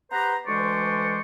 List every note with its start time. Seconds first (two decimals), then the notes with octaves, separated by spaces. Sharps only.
0.11 B3 G4 B4 C5 A#5
0.47 D2 E3 G#3 C5 D5 C#6